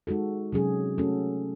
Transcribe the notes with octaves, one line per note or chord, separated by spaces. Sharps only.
G#3 D#4 F#4 A4
C3 F#3 C#4 G#4
A3 C#4 F#4 A4